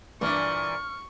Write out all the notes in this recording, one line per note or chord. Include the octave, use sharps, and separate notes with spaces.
G2 A#2 E3 D4 C#6 F6